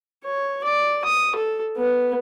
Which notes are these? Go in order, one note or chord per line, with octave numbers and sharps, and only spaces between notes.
C#5
D5
D#6
A4
B3